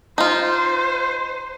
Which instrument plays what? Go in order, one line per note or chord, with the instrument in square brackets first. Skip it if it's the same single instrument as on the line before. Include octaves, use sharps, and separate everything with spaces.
[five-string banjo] D#4 F4 [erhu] C5